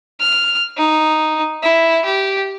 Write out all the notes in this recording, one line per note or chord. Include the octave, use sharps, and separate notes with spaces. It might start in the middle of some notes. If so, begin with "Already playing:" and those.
F6
D#4
E4
G4